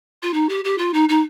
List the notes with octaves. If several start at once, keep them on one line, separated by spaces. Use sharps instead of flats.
F4
D#4
G4
G4
F4
D#4
D#4